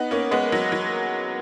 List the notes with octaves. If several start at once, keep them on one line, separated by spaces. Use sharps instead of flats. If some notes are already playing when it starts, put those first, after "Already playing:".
Already playing: B3 D#4
A#3 C#4
G#3 B3
F#3
F#3